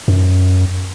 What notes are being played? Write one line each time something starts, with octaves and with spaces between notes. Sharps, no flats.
F#2